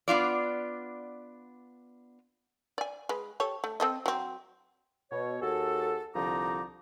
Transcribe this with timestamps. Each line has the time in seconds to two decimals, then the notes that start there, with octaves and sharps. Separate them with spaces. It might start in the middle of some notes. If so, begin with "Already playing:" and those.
0.08 B3 D4 F4 D5
2.78 D5 G#5
3.09 G#3 B4
3.40 G4 A4 C#5
3.64 A3
3.80 C4 A4 D#5
4.06 F#3 C4
5.12 B2 C#5
5.42 D#2 F#4 G#4 A4
6.15 C2 D3 F3 D#4 A#5 D6